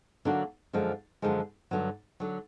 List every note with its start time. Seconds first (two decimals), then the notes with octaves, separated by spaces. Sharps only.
0.25 D3 F#3 A#3 D4 F#4
0.73 F#2 D3 F3 G#3
1.22 F#2 D3 F3 G#3
1.71 G2 D3 F#3
2.20 D3 F#3